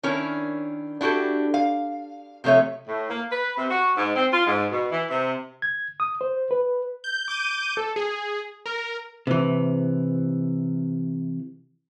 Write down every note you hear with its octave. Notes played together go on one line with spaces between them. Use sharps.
D#3 C#4 D4 E4 A#4 C#5
D4 E4 F#4 G4 A4
F5
C3 F3 A3 C#5 E5
A2
A#3
B4
C3
F#4
G#2
C4
F4
G#2
B2
E3
C3
G#6
D#6
C5
B4
G6
D6 G6 D#7
A4
G#4
A#4
C3 E3